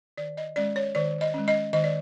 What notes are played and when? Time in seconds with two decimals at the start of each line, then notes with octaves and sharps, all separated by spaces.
0.18 D#3 D5
0.37 D#5
0.56 G#3 C#4 D5
0.76 C#5
0.95 D#3 D5
1.21 D#5
1.34 G#3 C#4
1.48 D#5
1.73 D#3 D#5
1.84 D5